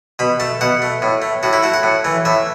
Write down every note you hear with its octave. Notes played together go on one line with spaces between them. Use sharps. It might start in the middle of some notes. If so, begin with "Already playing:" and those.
B2 B5
A3 A5
B2 F#5
A3
A2
A3
A2 F#4
E4
A3 F#4
F#5
A2
E3 A3
A2 E5